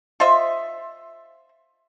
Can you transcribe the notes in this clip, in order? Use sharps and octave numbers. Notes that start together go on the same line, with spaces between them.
F4 C5 D#5 E5